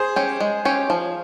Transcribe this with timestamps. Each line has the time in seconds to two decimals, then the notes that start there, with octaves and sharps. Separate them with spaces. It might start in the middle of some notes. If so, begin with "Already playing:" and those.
Already playing: G#4 C5
0.16 C#4 G4 C#5
0.40 G#3
0.65 C#4 G4 C#5
0.90 F3